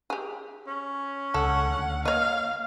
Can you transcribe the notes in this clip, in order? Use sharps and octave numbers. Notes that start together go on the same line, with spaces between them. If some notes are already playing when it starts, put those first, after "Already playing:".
G4 G#4
C#4
C#2 G#3 A4 F#5
D2
A#3 C#5 D#5 F5